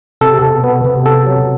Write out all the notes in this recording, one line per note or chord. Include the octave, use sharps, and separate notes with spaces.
C3 A4
C3 A4
B2
B3
C3 B3
A4
F#3